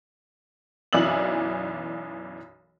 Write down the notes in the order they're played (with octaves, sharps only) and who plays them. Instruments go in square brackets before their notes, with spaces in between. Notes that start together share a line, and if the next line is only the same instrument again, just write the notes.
[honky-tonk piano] B1 F#2 E3 D5 E6 F#7